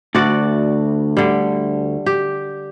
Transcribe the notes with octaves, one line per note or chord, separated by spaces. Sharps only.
D2 F#4 D5
D3 G3
G4